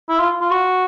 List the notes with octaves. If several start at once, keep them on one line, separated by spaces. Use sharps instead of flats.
E4
F4
F4
F#4